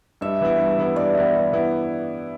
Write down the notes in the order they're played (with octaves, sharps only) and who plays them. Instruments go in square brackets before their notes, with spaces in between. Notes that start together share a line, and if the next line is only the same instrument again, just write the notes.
[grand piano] G2 [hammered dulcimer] E5
[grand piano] E3 B3 E4
G2
E3 B3 E4
[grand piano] G2 [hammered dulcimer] D5
[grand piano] E3 B3 E4
G2
E3 B3 E4